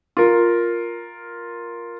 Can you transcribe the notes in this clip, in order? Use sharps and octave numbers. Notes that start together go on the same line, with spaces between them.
F4 A#4